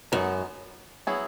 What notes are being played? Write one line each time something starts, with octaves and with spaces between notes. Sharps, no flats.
F#2 G#3 B3 D#4
F#3 B3 E4 G#4